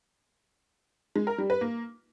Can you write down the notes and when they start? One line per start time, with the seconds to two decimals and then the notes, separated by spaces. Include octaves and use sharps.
1.16 G#3
1.27 A#4
1.38 G3
1.50 B4
1.61 A#3